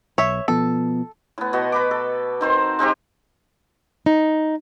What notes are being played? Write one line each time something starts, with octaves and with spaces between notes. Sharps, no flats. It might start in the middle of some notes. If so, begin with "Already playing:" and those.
B1 C#5 E5
B2 F3 B3 A4
A2 B3
B2 F#4 D#5
B4 B5 D6
A4
D#3 C4 C5
G#3 C4 D#4 G4
D#4